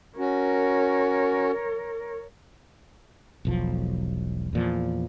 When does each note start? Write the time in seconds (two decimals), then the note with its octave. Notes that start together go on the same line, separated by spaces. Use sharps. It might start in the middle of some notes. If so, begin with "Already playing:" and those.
0.18 C#4 F#4 A#4 C#5
3.45 E1 B1 F3
4.53 E2 A#2 F3